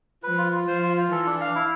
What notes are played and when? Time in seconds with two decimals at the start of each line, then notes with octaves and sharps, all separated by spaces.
0.23 F3 B4
0.38 F4
0.53 F4
0.67 F3 C5
0.82 F4
0.97 F4
1.11 E3 A4
1.26 D4
1.41 F5
1.55 E4